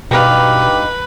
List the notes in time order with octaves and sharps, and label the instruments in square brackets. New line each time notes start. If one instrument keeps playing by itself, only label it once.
[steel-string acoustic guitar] G2 D#4 F5 [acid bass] B2 [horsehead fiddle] B4 [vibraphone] G5 D6